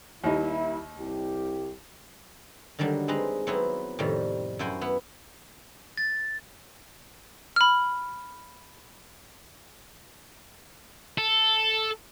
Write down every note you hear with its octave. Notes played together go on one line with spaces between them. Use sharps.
D#2 G3 A#3 D#4 E4
C2 G4
D3 D#3 F#3 G3 D4
G#3 C4 D#4 B4 A#5
F#3 B3 C4 E4 B4
F2 A2 C3 D#3 G3
F#2 E4 F#4 C5 G5 G#5
B3 E4 B4
A6
B5 F6
A4